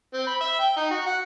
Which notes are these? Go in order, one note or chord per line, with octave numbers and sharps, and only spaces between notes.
C4
B5
E5
G5
D#4
F#4
F#5